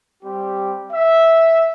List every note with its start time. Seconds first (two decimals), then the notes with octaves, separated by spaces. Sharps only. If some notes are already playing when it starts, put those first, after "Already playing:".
0.23 G3 C4 G4
0.92 E5